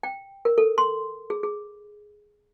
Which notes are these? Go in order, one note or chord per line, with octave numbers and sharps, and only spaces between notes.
G5
A#4
A4
C6
G#4
G#4